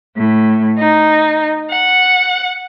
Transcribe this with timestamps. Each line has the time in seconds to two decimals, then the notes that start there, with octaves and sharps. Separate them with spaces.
0.16 A2
0.78 D#4
1.69 F#5